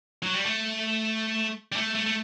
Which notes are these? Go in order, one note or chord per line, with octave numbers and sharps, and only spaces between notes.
F#3
G3
A3
G3
A3
A3
A3